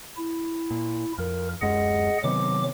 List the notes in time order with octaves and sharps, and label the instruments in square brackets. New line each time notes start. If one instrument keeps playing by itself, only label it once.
[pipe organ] E4
[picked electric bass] A#2
[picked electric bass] F2 [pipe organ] A#4
[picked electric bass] D1 F#2 G#3 [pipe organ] G#4 D#5 F#5
[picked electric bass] C3 D#3 B3 [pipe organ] F#3 D6